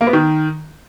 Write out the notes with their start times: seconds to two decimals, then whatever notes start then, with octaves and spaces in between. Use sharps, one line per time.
0.01 A#3
0.07 B3
0.13 D#3